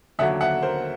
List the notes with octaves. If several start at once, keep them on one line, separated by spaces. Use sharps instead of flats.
D#2 D3 F#3 E5 F#5
E5 F#5
A#4 C5